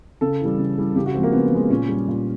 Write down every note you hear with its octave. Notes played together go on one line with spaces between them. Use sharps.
C#3 A4
E3 G3
C#3
E3 G3
C#3 G4
F#4
F3 G#3 C4
A#3
C#3 B3
F3 G#3
A#2 C#4
G3
A#2